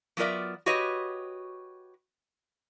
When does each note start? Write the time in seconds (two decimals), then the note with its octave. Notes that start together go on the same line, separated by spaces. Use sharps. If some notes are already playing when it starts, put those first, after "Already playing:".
0.17 F#3 B3 F4 A#4 D5 E5
0.66 F#4 G4 B4 C#5 D#5